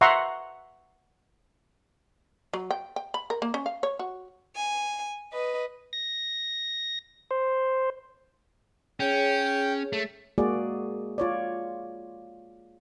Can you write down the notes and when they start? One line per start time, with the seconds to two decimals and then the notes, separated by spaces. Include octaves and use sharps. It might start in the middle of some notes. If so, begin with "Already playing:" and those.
0.01 E5 F#5 A#5 C6 C#6
2.53 F#3
2.71 G5
2.96 G5
3.14 B5
3.30 A#4
3.42 A#3
3.54 C#4
3.66 F5
3.83 C#5
3.99 F#4
4.55 G#5
5.32 B4 D#5
5.93 A#6
7.31 C5
9.00 C#4 G#4 C#5 G5
9.93 A3
10.38 G#3 A#3 F#4 G#4 D5
11.18 F4 C#5 D5